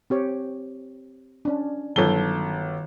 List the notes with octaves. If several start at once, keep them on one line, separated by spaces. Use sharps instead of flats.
C4 G4 C#5
C#4 D4
G1 D#3 F#3 A4 G7